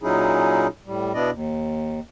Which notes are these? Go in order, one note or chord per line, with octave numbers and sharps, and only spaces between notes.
A#2 F#3 C#4 D#4 E4 G#4
A2 G3
B2 B3 D4 E4 D5 D#5
D#2